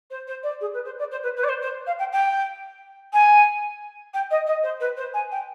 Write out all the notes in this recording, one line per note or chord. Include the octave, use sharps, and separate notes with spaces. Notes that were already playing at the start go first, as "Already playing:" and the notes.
C5
C5
D5
G#4
B4
C5
D5
C5
B4
B4
D5
C5
C5
F5
G5
G5
G#5
G5
D#5
D#5
C5
B4
C5
G#5
G5